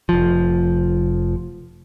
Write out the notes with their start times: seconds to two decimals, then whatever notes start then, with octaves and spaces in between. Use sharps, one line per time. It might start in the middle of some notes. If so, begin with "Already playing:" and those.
0.09 F1 F3